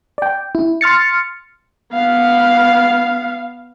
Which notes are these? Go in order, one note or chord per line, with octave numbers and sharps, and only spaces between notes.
D5 G5
E4
C6 F6 A6 C#7
B3 F5